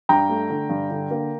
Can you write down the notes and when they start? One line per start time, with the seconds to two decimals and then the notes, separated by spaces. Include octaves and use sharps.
0.09 G2 G5 A#5
0.29 A3
0.50 D3
0.70 G2
0.91 D3
1.11 A#3